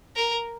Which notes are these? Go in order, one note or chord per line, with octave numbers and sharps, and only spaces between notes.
A#4